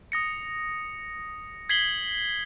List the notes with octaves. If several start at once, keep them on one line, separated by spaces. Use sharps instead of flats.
D#6 A#6 C#7
G#6 B6 C7 F#7 G7